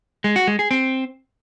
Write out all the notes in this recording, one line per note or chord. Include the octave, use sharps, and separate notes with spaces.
G#3
F#4
G#3
G#4
C4